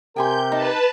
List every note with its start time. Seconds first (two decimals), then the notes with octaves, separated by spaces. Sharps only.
0.16 C3 G4 A#4 G5 G#5 C6 G6
0.52 D#4 B4 A5